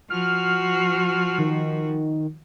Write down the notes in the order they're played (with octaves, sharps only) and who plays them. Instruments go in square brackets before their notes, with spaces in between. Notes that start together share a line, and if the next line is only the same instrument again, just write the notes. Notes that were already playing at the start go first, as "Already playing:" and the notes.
[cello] F3 F#4 [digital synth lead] F6
[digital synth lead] D#3